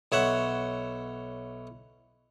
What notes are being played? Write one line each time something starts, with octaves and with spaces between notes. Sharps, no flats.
B1 C#5 E5 F#5